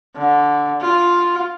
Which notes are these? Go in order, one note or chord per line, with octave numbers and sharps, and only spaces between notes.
D3
F4